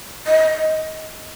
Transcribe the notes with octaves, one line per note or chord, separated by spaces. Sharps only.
D#5